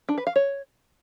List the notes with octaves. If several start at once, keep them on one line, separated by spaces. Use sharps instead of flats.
D4
B4
F5
C#5